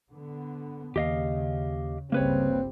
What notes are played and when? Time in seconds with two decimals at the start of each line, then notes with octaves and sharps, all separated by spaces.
0.11 D3 B3
0.96 D#2 C#3 G4 D#5 F5
2.12 G1 C#2 C#3 G3 A#3 C4 B4 C#5